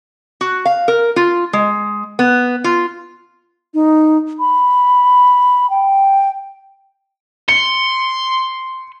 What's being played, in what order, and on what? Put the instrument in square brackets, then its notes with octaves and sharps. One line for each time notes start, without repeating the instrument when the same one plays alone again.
[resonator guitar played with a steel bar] F#4
F5
A#4
F4
G#3
B3
F4
[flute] D#4
B5
G5
[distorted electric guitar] C6 [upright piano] C#7